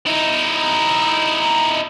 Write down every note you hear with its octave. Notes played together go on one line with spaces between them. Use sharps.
D#4 E4